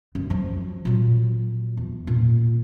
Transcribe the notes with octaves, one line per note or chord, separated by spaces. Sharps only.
F#2 D3
F3 F#3
A#2 F#3
E2
A#2